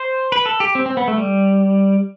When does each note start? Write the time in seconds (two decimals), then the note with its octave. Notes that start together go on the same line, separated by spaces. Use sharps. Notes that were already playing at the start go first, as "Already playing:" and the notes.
Already playing: C5
0.32 B4
0.46 A4
0.60 G4
0.75 C4
0.86 C4
0.97 B3
1.08 A3
1.18 G3